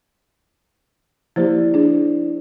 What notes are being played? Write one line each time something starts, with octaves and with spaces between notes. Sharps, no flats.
F3 A#3 E4 G4 C5 D5
D4 G#4